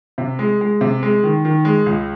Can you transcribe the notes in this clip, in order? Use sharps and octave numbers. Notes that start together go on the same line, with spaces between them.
C3
G#3
G#3
C3
G#3
D#3
D#3
G#3
C#2